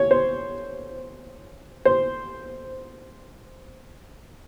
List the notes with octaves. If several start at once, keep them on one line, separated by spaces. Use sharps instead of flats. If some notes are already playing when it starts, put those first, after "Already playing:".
Already playing: C#5
C5
C5